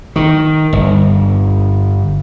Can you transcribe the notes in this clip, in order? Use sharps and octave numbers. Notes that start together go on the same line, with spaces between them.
D#3
G1